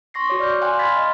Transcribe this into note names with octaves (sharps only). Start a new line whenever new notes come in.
C6 C#6 A#6 C7
F#4 C#5 D6
D5 F6 G6
F5 G5 G#5 C6 F#6
B5 C6 F6 G#6 A6 B6
D#5